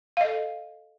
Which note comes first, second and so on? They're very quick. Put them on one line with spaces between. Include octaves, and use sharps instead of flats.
F5 D#5 A4